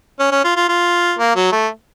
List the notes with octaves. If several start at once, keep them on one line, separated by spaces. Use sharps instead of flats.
C#4
C#4
F4
F4
F4
A#3
F#3
A3